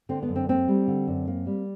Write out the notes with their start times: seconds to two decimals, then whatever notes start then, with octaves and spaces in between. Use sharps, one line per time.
0.09 D3 C4
0.23 B3
0.29 F#2
0.36 C4
0.49 A#3 C4
0.68 G3
0.88 D3
1.07 F#2
1.27 A#3
1.47 G3